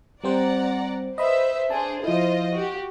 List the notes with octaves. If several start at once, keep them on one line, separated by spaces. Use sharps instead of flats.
G3 C4 C5 D5 F#5 A#5
B4 C5 D#5 E5 B5
D4 G#4 C5 A5
F3 E4 F4 C5 D#5
F#4 G4